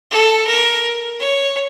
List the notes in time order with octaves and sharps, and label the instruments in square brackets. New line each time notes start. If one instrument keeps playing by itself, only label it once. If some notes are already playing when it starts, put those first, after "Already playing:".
[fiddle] A4
A#4
C#5